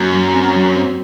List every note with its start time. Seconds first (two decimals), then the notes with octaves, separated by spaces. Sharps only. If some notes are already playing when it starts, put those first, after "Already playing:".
Already playing: F#2 A#3 F#4
0.14 F#3
0.34 C4
0.56 F#3
0.77 C4